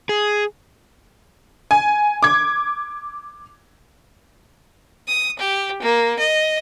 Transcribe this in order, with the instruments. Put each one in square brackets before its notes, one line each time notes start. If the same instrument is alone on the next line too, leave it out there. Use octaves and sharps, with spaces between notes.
[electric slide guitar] G#4
[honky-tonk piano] G#5
D6 G#6
[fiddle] D#6
G4
A#3
D#5